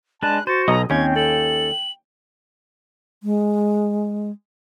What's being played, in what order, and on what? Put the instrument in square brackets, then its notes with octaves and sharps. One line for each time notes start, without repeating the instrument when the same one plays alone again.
[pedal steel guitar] G#3 D4 B4 [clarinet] A5 [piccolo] F#6
[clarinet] F#4 [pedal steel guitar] C5 [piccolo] A6
[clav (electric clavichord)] B1 [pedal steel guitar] F#3 D#5 D#6 [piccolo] A#5
[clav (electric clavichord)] D#2 C#4 [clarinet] C4 [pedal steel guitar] G5 [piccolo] G#6
[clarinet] A4 [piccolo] F#7
[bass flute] G#3